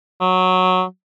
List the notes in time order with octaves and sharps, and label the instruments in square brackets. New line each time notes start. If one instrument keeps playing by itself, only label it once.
[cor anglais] F#3